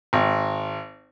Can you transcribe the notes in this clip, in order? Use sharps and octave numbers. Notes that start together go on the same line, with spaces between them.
G#1